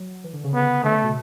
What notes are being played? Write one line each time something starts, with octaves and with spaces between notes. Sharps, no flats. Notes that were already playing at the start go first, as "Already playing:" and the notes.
Already playing: F#3
E3
D3
C#3
B3
D3 A3
C#3
B2